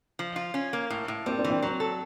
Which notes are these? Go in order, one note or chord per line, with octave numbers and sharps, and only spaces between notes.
F3
F4
C#4
A#3
A2
A2
G3 A#3 C4
C4 D4
E3
C4 D4
F#3
A4